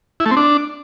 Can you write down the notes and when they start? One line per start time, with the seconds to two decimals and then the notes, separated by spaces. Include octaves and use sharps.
0.20 E4
0.26 A3
0.31 C4
0.37 D4